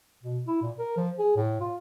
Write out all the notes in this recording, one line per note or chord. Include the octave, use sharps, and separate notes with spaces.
B2
E4
A#2
A#4
F3
G#4
A2
F4